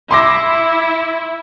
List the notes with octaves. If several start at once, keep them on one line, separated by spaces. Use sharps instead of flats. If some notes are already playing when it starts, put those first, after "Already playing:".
E4 C6 D6 A#6